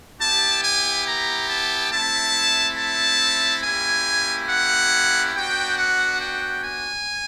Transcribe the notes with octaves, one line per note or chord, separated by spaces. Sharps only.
B3 E4 G4 A5
G#5
A#5
A5
A3 C4 E4 A5
A5
A#3 C#4 E4 G4 G#5
F#5
B3 D4 F#4 G5
F#5
G5
G#5